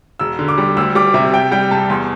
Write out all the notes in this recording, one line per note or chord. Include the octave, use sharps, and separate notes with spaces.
E1 E6
D3
D6
G3
D2 E6
G3 D6
C3 E5
C3 G5
G3 G5
C2 A5
E2 C6